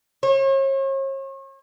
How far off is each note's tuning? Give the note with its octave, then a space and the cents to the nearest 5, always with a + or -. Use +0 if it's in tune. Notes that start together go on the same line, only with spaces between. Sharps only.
C#5 -40